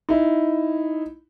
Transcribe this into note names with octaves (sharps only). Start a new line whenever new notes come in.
D#4 E4